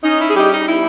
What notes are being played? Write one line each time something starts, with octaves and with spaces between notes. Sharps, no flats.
C#4 D#4
E4
G#4
G3 D#4 G4
D#4
B3 E4